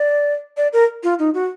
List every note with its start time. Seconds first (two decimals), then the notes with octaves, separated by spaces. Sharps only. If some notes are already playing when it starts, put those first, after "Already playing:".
Already playing: D5
0.57 D5
0.73 A#4
1.03 F4
1.19 D#4
1.34 F#4